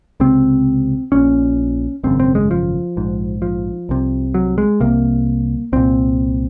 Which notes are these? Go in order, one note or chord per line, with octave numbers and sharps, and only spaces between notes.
C#2 C3 C4
A#1 A#2 C#4
G#1 F#2 C#3 C4
C4
G#3
F3
A#1 G#2
F3
C2 C3
F#3
G#3
C2 C3 A#3
C2 A#2 C4